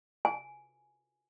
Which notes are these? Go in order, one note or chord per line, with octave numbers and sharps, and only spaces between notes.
G#5